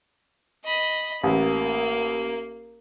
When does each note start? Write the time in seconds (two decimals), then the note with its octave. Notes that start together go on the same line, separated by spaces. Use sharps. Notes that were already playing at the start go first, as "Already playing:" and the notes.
0.64 D#5 B5
1.24 A1 A#3